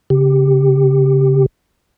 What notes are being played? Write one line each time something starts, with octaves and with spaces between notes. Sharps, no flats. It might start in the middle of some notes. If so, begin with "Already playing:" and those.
C#3 G4